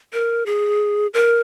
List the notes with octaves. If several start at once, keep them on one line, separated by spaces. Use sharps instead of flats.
A#4
G#4
A#4